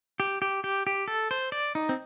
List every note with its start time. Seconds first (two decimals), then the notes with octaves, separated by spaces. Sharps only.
0.20 G4
0.42 G4
0.64 G4
0.87 G4
1.08 A4
1.31 C5
1.52 D5
1.75 D#4
1.89 C4